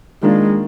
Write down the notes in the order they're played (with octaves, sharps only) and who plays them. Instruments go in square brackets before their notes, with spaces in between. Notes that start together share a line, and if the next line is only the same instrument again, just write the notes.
[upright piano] D#3 A#3 D4 F4 [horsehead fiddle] G#3